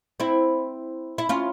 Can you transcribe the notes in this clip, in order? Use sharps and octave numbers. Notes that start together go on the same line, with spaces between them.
C4 E4
E4
C#4 F4